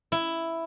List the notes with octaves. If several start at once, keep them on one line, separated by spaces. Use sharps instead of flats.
E4